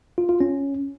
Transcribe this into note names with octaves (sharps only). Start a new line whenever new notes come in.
F4
F4
C#4